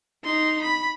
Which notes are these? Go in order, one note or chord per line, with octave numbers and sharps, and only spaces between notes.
D#4 C6
B5